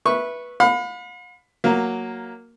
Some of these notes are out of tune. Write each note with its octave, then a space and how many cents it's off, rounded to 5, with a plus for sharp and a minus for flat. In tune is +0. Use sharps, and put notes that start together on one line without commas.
B4 -15 E5 +0 C#6 -10
F5 +45 B5 +15
F#3 +0 A#3 +0